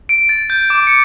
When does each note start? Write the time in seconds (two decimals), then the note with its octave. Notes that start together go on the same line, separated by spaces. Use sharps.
0.09 D7
0.29 A6
0.50 G6
0.70 D6
0.87 C#7